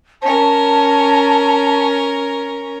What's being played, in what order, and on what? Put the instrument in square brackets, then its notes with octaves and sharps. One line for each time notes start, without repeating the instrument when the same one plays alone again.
[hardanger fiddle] C#4 A#4 [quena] A5